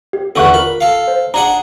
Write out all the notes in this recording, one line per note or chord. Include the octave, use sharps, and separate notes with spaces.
G4
E2 D3 B3 A4 C#6 F#6
F4 A#4 B5
A4 F5
C5
D4 G#4 F#5 A#5